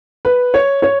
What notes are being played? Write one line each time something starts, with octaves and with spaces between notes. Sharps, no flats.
B4
C#5
C#5